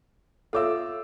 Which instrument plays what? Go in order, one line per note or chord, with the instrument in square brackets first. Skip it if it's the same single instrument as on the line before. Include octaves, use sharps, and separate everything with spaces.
[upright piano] F4 D6 E6 [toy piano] A4 C#5 E5